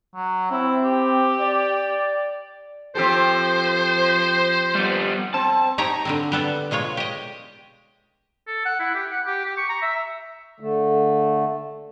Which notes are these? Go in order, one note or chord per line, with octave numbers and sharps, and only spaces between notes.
F#3
C4 E4
G4
D5
F3 C4 G4 A4 C5
G3 B3
C4 A5
D#4 G4 C#5 A#5
D3 G3 C4
G3 B3 A4
B2 G#3 F4 C#5
G4 D#5
A4
F#5
E4
G4
F#5
G4
G4
C#6
A#5
E5
D3 A3